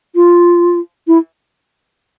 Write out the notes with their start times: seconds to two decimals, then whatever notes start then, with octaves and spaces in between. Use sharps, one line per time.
0.15 F4
1.08 E4